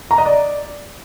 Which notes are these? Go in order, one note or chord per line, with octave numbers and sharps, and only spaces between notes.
A#5
D#5
D5